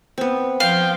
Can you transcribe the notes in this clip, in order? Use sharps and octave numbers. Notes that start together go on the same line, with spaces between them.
B3 C4
F3 F5 G5